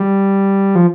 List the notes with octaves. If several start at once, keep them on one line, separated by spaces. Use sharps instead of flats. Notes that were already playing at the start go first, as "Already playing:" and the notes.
Already playing: G3
F3